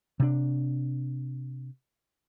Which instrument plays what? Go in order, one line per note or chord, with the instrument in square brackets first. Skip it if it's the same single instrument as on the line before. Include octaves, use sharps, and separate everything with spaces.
[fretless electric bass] C3 D4